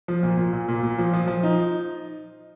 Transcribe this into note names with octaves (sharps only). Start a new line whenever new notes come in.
F3
A#2
A#2
A#2
A#2
A#2
F3
F3
F3
D#4